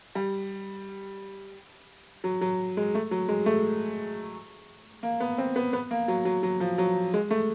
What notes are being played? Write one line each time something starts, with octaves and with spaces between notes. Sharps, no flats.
G3
F#3
F#3
G#3
A3
F#3
G#3
A3
A#3
B3
C4
B3
B3
A#3
F#3
F#3
F#3
F3
F#3
G#3
A3